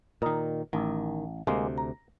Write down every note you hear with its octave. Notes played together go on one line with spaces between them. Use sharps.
A#2 D#3 A#4 D#5
A1 D#3
D2 C3 G#3 A#3
A#5